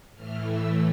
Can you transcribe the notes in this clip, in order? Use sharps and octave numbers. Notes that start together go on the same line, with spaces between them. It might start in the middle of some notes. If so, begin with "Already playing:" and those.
A2 E3 A3 F6
E6